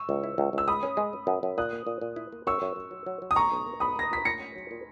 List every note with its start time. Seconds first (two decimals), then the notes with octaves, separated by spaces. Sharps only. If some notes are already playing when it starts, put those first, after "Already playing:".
Already playing: C#6 E6
0.09 C#2
0.24 E4
0.38 C#2
0.53 C#2 E6
0.68 G#3 B5 D#6
0.83 C#4
0.97 G#3
1.13 C#4
1.27 F#2
1.43 F#2
1.58 A#2 D#6 F#6
1.73 A#3
1.87 A#2
2.01 A#2
2.16 E4
2.32 A#3
2.47 F#2 C#6 E6
2.62 F#2
2.76 F#2
2.91 F#3
3.06 F#3
3.22 F#3
3.31 D#6
3.36 B1 A#5 C#6
3.52 B1
3.67 A#3
3.80 B1 B5 D#6
3.96 A#3 A#6
4.11 A#2 B6
4.25 A#2 A#6 C#7
4.40 C#4
4.56 F#3
4.71 A#2